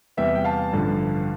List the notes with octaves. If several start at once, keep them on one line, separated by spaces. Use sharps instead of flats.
E2 C3 G3 B3 E5 G5
G5
F5 A5
A1 G2 D3 F3